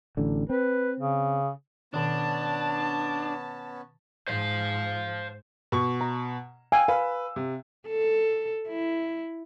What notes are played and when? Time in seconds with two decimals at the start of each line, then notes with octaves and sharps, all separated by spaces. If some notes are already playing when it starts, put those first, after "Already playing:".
0.17 A1 D3
0.50 C4 B4
1.00 C#3
1.94 B2 D#3 B3 C#4 D4 A5
4.28 G#2 C5 F5
5.72 B2 C#6
6.01 A#5
6.72 F5 G5 G#5 E6
6.88 B4 F5
7.36 C3
7.88 A4
8.68 E4